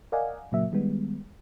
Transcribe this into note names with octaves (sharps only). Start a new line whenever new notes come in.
A#4 D5 D#5 F5 F#5 G#5
A#2 C#3 F#3 A#3 E5
D#3 G3 G#3 B3